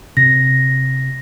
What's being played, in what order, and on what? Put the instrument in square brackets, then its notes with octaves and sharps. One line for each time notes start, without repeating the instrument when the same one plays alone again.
[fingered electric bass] C3 [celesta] A#6